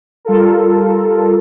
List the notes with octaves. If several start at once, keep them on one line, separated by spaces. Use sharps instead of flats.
G3 F4 A4 A#4